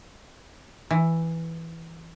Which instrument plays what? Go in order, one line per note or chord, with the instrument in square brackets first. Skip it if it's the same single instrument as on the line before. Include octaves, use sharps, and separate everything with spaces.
[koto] E3